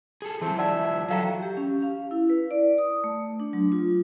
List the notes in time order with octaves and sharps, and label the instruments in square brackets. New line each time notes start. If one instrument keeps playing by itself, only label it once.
[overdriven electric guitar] G#4 A4
[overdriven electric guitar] E3 F#3 [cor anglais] C4 [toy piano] A5
[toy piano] D5 F#5 A5 [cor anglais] E5
[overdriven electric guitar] F#3 [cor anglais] A4 [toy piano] F5 G5 A#5
[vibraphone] G4
C#4
F5
E4
B4
D5
D#6
A3
D4
F#3
F4